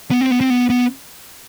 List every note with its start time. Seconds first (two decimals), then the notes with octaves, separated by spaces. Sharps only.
0.11 B3
0.21 C4
0.31 B3
0.41 C4
0.50 B3
0.70 B3